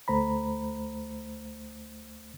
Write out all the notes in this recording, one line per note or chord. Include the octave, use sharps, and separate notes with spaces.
D2 A3 C5 A#5 B5